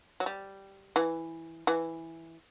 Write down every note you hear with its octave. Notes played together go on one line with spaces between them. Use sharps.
F#3
G3
E3
E3